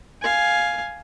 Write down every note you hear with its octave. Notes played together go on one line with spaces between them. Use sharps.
F5 G#5